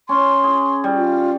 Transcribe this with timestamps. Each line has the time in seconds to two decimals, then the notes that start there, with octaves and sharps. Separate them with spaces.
0.09 C#4 C6
0.44 G#4
0.84 G3
0.96 F4